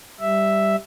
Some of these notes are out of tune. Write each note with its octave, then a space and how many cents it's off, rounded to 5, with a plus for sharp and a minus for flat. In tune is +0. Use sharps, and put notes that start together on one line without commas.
G3 +0 E5 +0